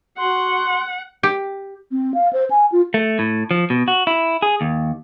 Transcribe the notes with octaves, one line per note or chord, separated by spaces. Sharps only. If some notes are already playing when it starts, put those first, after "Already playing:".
F#4 F#5 C6
G4
C4
F5
C5
G#5
F4
A3
A2
F3
B2
F#4
E4
G#4
D#2